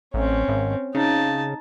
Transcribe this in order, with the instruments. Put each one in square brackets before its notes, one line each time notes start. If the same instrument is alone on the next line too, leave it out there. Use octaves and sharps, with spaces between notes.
[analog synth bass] A1 [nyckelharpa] C4 C#4
[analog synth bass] G#1
[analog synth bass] C#3 [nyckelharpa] D#4 A5